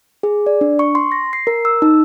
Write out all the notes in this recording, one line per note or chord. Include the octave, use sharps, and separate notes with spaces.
G#4
D5
D4
C#6
C6
A#6
C7
A#4
E6
D#4